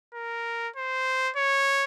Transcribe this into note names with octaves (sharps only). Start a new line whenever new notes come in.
A#4
C5
C#5